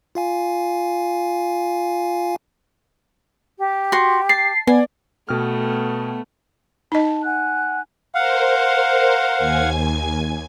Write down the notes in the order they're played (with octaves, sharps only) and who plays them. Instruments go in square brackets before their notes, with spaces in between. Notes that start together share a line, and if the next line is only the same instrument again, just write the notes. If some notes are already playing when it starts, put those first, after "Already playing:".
[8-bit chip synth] F4 F5 G#5
[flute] G4
[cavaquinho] F#4 C6
[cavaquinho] A5 [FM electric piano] C7
[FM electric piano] B3 [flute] D5 [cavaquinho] G#5
[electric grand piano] B2 G5 F6 [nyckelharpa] A3 B3
[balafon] D#4 D#5 [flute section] A5
[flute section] F#5 G#5 F#6
[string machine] A#4 C5 [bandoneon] F5 F#5
[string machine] D#2 G#5 G#6